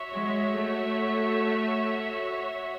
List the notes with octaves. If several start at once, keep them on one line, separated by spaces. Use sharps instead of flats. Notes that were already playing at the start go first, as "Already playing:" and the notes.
Already playing: F#4 C#5 E5
G#3
A3